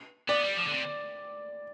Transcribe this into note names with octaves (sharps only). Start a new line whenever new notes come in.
B3 D5
G3
F3
D3
C3